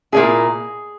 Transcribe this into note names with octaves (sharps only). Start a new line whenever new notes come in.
A#2 A#3 C#4 E4 G#4